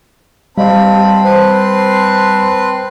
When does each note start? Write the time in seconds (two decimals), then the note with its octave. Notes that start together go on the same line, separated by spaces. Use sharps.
0.58 G3 C4 G4 D#5 F5 A5 B5
1.24 C4 B4 C5 C6